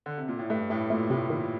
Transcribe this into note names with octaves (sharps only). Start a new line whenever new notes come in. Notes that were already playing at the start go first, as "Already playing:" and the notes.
D3
C3
A#2
A2
G2 A3
A2 A3
A#2 A3
A2 C3
A#2 D#3